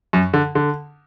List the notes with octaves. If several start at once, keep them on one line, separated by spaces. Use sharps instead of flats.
F#2
D3
D3